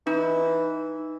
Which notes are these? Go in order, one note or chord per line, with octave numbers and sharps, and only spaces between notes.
E3 D#4